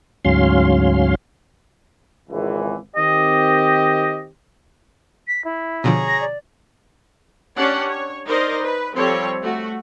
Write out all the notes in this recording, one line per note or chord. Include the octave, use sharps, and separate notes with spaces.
D2 G#2 F#3 C#4 F5 C6
G#1 C#2 E3
D#3 C4 G4 D#5
B6
E4
B2 D3 F3 G#4 C#5 A#5
A#6
D5
C#4 D4 G4 D5 F#5
C#5
D#4 A#4 C5 D5 D#5
B4
F3 G3 C4 A4 C#5
A3 F#4